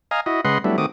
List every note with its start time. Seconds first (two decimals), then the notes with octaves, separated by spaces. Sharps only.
0.11 D#5 F5 G#5 A#5
0.26 E4 F#4 D#5
0.45 C#3 G#3 B4 D#5 F#5 C6
0.64 F#3 G3 A3 B3 D4 E4
0.78 D#3 A3 C4 F#4 D6 D#6